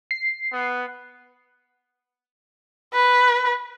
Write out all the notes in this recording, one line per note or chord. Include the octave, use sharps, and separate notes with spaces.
C7
B3
B4